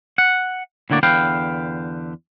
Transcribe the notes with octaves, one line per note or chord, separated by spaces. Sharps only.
F#5
A2 D3 A#3 F#4 D5
E2 D3 B4 F5 G5